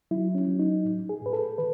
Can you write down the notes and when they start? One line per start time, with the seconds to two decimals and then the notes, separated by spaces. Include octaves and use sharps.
0.11 F#3 E4
0.35 C#4
0.48 F#3
0.59 D#4
0.85 A2
1.09 G#4
1.21 A2
1.26 B4
1.33 A4
1.58 D#3 B4